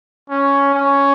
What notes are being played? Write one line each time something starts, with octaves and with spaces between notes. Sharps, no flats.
C#4
C#4